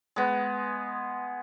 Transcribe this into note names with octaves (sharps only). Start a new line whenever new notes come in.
G#3 B3